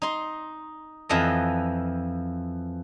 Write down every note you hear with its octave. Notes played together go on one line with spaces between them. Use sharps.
D#4 C6
F2 E3 F3 D#5